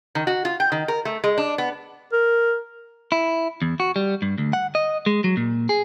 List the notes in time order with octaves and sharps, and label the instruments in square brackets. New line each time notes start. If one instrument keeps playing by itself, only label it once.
[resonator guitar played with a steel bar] D#3
F#4
F4
G5
D#3
A#4
A3
G#3
D4
B3
[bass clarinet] A#4
[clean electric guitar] E4
E2
F#4
G3
G2
D2
F#5
D#5
G#3
F#3
A#2
G#4